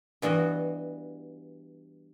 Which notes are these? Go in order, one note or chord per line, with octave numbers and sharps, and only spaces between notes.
G2 E3 B3 F#4 D#5